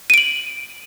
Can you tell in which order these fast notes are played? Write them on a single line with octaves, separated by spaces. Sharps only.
D#7 D7 F#7